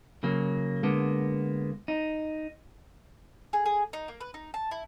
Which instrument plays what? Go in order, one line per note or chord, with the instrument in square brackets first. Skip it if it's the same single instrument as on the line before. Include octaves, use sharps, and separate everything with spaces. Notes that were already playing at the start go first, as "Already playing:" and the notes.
[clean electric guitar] C#3 F#3 A#3
D3 G#3 A#3 B3
D#4
[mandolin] G#4
G#4
D#4
A#3
B4
D#4
A5
E4